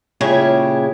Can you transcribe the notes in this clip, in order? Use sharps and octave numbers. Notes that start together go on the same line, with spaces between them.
A#2 C#3 G#3 E4 G4 C#5